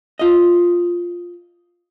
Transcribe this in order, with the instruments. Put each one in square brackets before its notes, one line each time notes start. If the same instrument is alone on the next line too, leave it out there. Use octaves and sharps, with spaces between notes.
[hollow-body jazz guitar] F4 D#5